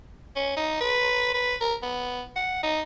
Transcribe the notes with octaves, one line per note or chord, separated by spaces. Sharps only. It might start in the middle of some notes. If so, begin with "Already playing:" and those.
C#4
D#4
B4
B4
A#4
B3
F#5
D#4